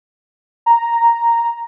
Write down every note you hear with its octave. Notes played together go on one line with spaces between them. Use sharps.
A#5